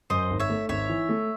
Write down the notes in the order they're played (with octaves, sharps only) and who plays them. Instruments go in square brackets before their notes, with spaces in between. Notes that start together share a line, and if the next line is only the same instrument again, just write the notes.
[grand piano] F#2 [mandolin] C5 D#5
[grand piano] G#1
[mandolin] C#5 E5
[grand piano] A3
[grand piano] G#1 [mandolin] C#5 E5
[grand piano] E3
A3